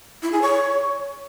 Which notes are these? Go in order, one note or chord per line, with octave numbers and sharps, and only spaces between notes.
E4
G#4
C#5